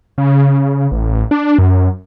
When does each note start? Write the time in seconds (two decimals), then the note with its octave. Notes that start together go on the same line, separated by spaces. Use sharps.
0.18 C#3
0.92 A1
1.31 D4
1.59 F#2